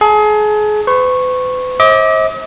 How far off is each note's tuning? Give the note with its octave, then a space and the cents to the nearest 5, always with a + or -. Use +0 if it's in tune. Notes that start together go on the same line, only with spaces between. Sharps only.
G#4 +30 A5 +30
B4 +45 C#6 -15
C5 +35 D#5 +45 D6 +0